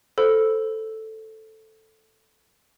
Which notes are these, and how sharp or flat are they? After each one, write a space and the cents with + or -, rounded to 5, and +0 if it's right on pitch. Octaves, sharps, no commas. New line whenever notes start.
A4 +0 C5 +0 B5 +0